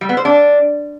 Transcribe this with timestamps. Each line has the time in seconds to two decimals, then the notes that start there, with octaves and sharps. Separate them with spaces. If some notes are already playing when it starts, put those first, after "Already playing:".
0.01 G3
0.09 B3
0.17 C5
0.25 D4